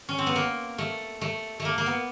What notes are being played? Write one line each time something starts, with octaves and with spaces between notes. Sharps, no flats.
C#4
C4
B3
A#3
A3
A3
A3
A#3
A#3
B3